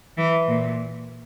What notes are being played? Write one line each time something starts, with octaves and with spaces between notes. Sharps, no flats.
E3
A#2